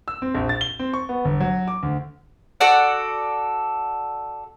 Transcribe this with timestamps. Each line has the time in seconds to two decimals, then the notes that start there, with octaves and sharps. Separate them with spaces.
0.08 E6
0.22 C4
0.35 A#1
0.49 A6
0.61 G7
0.79 C4
0.93 C#6
1.09 B3
1.25 G1
1.40 F#3
1.68 D6
1.83 D2
2.60 F#4 A4 D5 F#5